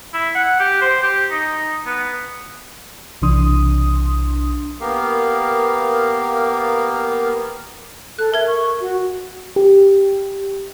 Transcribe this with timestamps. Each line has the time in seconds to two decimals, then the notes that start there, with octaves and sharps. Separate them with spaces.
0.14 E4
0.35 F#5
0.60 G4
0.82 C5
1.02 G4
1.31 D#4
1.86 B3
3.22 B1 C3 E3 D4 C6 D#6
4.80 A#3 B3 G4 A#4 F5
8.19 A4 F#6
8.34 A#4 E5 G#6
8.47 C#6
8.81 F#4
9.56 G4